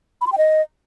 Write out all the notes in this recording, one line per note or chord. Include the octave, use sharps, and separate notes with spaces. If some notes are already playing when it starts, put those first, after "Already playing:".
B5
C6
G5
D#5